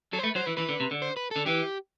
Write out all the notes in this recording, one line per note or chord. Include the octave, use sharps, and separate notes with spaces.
F#3 A4
C5
A3 B4
F#3 C5
E3 B4
E3 B4
D3
C3
D3
C5
B4
D3 A4
E3 G4